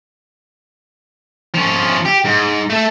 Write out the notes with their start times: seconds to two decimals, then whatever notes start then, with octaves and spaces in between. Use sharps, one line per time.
1.55 F3 C#4
2.06 G4
2.25 G#2
2.70 A3 A4